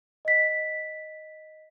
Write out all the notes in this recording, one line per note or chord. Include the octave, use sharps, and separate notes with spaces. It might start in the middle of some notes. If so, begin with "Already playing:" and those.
D#5 B6